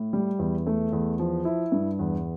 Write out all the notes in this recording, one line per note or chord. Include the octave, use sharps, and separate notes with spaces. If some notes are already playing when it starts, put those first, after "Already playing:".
Already playing: A2
G3
E2
A3
E2
F3
E4
G2
E2